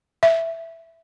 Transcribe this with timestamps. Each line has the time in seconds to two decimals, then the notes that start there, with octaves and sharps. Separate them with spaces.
0.23 E5